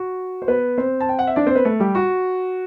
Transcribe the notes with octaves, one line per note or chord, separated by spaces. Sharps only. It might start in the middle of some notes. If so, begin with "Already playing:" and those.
Already playing: F#4
C5
B3 B4
C4 C5
A5
G5
F#5
E5
D4 D5
C4 C5
B3 B4
A3 A4
G3 G4
F#4